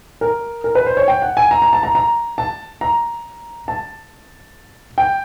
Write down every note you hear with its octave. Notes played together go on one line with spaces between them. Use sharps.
A#4
A#4
B4
C5
C#5
G5
F#5
G#5
A#5
A#5
A5
A#5
A#5
A5
A#5
A5
G5